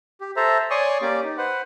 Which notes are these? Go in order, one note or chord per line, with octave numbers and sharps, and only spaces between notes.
G4
A4 C5 E5 A#5
C#5 D5 G#5 C6 C#6 D#6
A#3 C#4 G4 D5 D6
D#4
B4 C5 F#5